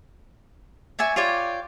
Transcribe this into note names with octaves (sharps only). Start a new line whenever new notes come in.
C#5 D5 E5 G#5
F4 G4 C#5 D5